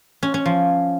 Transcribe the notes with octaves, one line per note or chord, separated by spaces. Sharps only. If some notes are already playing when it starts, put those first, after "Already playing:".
C#4
C#4
F3